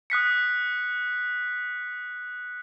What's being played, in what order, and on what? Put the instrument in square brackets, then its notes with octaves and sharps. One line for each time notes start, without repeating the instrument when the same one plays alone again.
[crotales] D#6 F#6 B6 C#7